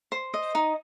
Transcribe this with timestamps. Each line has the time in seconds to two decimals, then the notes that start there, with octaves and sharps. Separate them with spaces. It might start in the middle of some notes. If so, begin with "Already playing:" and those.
0.12 C5
0.34 D#5
0.55 D#4